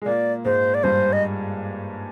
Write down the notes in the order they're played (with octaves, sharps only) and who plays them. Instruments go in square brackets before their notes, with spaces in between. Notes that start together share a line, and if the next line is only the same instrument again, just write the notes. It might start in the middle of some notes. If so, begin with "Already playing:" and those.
[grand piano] G#3
[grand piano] A#2 A#3 [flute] D5
[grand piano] G#2 G#3 [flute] C5
[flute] D5
[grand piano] G2 G3 [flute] C5
[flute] D#5